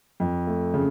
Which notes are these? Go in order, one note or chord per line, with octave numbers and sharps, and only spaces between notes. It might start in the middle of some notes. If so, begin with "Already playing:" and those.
F2
A3
C#3